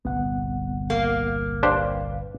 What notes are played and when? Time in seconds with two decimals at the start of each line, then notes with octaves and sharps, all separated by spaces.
0.05 G1 C2 A#2 B3 F#5
0.90 A#3
1.63 D4 G4 B4 C5 F5